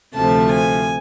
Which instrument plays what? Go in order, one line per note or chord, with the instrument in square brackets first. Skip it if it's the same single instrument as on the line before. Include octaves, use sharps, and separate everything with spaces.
[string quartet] D2 C3 F3 A3 A5
G#5